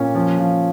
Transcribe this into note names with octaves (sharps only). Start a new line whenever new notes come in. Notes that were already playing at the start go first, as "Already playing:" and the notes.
Already playing: A#2 C#4
F3
F3